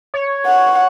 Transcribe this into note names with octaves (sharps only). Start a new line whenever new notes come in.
C#5
F#5